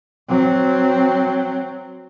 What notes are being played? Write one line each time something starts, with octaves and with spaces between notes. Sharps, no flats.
F#3 C4